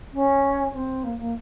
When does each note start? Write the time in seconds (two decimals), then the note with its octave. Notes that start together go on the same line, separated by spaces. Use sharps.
0.14 C#4
0.74 C4
1.04 A#3
1.19 A#3